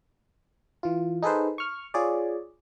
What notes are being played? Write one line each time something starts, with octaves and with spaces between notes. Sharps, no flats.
E3 F4
D#4 G#4 A4 B4 C5
C#6 F6
F4 G#4 C#5 D5